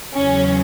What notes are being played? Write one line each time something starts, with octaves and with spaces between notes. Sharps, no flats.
E2 C#3 F#3 C#4